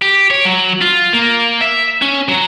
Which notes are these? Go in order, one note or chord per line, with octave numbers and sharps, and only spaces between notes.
G4
C#5
F#3
F4
A#3
E5
C#4
F#3